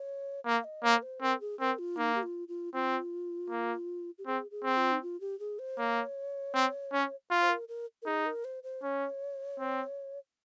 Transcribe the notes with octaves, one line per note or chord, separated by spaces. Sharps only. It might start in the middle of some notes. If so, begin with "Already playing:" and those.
Already playing: C#5
A#3 F5
F5
D#5
A#3 C#5
A#4
C5
C4 A#4
G#4
C4 A#4
F4
A#3 D#4
G4
F4
F4
C4 F4
A#3
G4
C4 G#4
G#4
C4
F4
D#4
F4
G4
G#4
C5
A#3 C#5
C4
C#4
F4
C5
A#4
A#4
A#4
D#4 G#4
A#4
C5
C5
C#4 C#5
C4